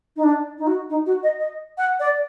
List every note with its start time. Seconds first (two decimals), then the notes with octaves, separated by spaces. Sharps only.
0.16 D#4
0.23 D4
0.58 D#4
0.67 F#4
0.89 D#4
1.06 F#4
1.23 D#5
1.39 D#5
1.78 F#5
2.00 D5